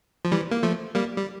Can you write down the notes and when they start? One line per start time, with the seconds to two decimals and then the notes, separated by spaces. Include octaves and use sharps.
0.25 F3
0.32 E3 G3
0.51 A#3
0.63 F3 A3
0.95 G3 A#3
1.17 G3